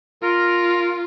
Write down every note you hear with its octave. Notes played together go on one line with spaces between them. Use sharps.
F4 A#4